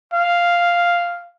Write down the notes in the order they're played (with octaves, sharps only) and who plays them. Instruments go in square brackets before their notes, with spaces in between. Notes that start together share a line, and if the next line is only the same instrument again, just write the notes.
[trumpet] F5